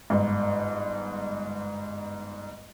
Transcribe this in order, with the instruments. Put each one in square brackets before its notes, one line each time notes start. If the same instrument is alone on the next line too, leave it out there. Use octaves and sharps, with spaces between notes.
[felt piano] G1 G#2